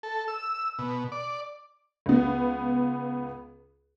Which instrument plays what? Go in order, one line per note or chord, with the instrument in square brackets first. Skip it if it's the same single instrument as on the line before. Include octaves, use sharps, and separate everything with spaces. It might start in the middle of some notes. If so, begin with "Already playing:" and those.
[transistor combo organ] A4
E6
B2
D5
[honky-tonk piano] C#2 B3